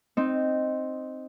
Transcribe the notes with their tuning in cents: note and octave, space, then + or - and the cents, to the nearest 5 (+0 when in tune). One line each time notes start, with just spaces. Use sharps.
C4 +0 D#4 -5